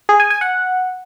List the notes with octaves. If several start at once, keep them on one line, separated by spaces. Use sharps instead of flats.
G#4
G#5
G#5
F#5